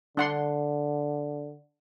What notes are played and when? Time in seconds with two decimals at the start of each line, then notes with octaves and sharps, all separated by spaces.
0.17 D3 D4 F#5 C6